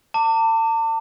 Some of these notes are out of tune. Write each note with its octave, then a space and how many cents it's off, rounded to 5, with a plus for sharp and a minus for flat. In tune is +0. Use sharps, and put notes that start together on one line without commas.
A5 +40 D6 +0